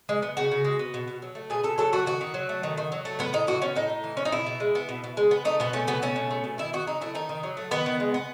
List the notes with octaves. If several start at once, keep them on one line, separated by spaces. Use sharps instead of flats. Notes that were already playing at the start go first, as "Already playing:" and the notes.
G#3
B3
C#3 F#4
C#3
G#3
B3
B2
B2
F#3
A3
B2 G#4
B2 A4
F#3 A4
A3 F#4
D#3 F#4
D#3
F#3
A3
D#3
D#3
F#3
A3
A2 B3
A2 D#4
E3 F#4
B3 C#4
A2 D#4
A2
E3
B3 C#4
D#4
B2 E4
B2
G#3
B3
B2
B2
G#3
B3
A3 D#4
B2 B3
A3 C#4
B2 B3
A3 C#4
B2
A3
B2
D#3 E4
D#3 F#4
F#3 D#4
A3 E4
D#3 D#4
D#3
F#3
A3
D#3 B3
D#3
G#3
B3